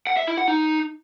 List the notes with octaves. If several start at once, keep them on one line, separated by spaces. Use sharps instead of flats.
F#5
E5
E4
F#5
D#4